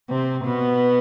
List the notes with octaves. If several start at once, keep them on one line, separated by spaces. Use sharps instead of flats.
C3 C4
B2 B3